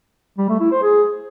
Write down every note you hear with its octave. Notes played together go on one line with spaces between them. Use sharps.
G3
A3
E4
C5
G#4